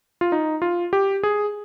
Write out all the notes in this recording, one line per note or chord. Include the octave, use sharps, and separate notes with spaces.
F4
D#4
F4
G4
G#4